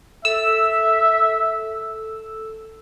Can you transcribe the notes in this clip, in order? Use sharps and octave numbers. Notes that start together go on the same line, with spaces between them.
A4 E5 E6